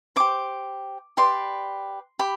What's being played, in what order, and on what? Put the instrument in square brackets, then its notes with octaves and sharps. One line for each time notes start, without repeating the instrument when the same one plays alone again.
[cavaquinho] G4 C5 D6
G4 B4 D5 C6
G4 B5